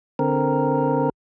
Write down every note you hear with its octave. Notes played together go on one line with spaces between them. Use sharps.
D3 C4 A#4